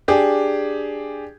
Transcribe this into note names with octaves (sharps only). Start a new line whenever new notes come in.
D4 G4 G#4